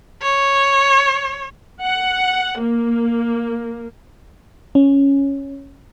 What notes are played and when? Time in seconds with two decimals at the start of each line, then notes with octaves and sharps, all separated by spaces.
0.22 C#5
1.83 F#5
2.61 A#3
4.75 C#4